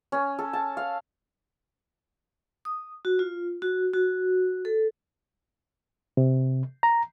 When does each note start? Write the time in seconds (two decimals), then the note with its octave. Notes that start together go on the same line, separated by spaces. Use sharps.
0.12 C#4
0.39 A4
0.53 A5
0.77 F5
2.65 D#6
3.05 F#4
3.19 F4
3.62 F#4
3.94 F#4
4.65 A4
6.17 C3
6.83 A#5